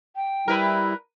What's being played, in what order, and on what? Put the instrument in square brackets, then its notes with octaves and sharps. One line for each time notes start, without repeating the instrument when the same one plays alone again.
[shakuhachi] G5
[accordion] G3 E4 [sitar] A#4 B4